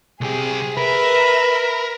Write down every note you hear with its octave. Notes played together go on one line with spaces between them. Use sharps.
C2 G4 G#4
A#4 B4 E5 B5